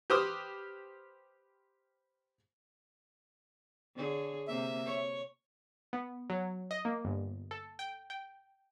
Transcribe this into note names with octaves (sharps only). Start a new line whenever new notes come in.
G4 B4 C5 D6 D#6 F6
D3 G#4 C#5
C3 A#3 E5
C#5
B3
F#3
D#5
A#3
G1
A4
G5
G5